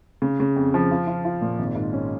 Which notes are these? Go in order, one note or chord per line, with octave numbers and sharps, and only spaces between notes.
C#3
C#3
F2
F3
F4
F4
F4
A#2
G#1
G#2
C#4